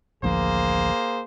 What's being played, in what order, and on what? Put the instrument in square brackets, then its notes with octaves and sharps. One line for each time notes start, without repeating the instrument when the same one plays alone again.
[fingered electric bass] A1 D2 F3 [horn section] A#3 G#4 C5